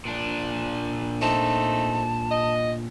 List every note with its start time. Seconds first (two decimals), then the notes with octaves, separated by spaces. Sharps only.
0.05 A#2 D4
1.21 A3 C4 D#4 A5
2.31 D#5